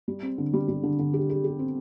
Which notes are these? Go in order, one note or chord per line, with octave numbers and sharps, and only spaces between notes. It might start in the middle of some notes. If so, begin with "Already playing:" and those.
G3
C4
D3
G3
G3
D3
D3
G4
G4
G4
C4